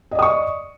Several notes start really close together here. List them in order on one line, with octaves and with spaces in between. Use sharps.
D#5 D5 D#6 C#6